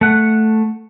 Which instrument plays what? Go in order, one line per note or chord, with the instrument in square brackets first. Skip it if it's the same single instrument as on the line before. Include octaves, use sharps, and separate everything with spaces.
[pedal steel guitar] A3 F#5